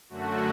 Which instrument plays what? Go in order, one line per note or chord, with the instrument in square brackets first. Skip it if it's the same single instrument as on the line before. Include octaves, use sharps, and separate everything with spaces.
[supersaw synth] F#2 D3 A3 F#4